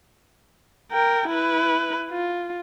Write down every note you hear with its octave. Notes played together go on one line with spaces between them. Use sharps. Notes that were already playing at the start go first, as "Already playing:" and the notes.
A#4 G5
E4 B4
F4